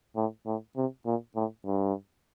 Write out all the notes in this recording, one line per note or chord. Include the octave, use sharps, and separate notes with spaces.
A2
A2
C3
A#2
A2
G2